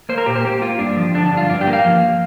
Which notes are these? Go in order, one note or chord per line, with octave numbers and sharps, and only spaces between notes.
A#3 C5
A#4
A#2 G4
C5
A#3 G4
A#3 F4
G2 D4
F3
D3 D4
D4
G2
F4
G2 D4
G4
A#3
F5
F3